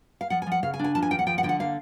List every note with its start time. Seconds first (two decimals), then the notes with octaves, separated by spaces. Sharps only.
0.21 F5
0.30 F3 F#5
0.42 G#5
0.47 F3
0.52 F#5
0.63 C#3 F5
0.74 G#5
0.79 D4
0.84 G#5
0.95 F3 A5
1.02 G#5
1.11 D#2 G5
1.19 F#5
1.27 F3 G5
1.38 F#5
1.43 D3 G5
1.49 F#5
1.60 A#3 F5